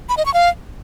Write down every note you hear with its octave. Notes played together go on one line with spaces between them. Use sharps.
B5
D#5
C#6
F5